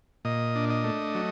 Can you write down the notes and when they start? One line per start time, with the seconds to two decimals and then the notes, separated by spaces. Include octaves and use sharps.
0.25 A#2 D#5
0.55 D4
0.70 D#5
0.84 A3
1.15 F#3